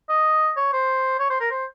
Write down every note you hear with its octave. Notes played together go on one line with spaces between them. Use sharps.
D#5
C#5
C5
C#5
C5
A#4
C5